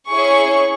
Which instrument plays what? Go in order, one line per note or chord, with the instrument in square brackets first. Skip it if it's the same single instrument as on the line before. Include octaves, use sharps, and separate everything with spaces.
[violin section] C#4 E4 G#4 C#6